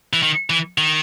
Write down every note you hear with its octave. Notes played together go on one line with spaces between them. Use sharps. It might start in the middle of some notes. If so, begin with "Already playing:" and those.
E3
D#3
E3
D#3